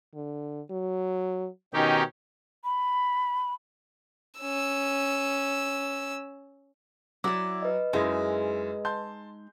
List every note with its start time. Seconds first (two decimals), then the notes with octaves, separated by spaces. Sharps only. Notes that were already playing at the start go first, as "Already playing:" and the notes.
0.15 D3
0.71 F#3
1.74 B2 D#3 C#4 D#4 G4
2.64 B5
4.40 C#4 E6
7.24 F#3 E4 D5 D6
7.63 B4 D#5
7.93 F#2 G#3 D#4 E4
8.85 A5 C6 G6